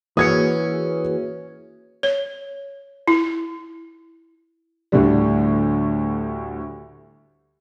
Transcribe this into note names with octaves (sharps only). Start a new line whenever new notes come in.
E3 A#3 C#4 F#4 G#4 D#6 G#6 C#7
C#5
E4
D2 A2 D3 G3